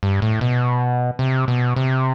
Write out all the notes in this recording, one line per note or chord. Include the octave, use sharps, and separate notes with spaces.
G2
A2
B2
C3
B2
C3